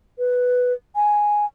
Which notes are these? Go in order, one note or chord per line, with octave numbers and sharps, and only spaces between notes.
B4
G#5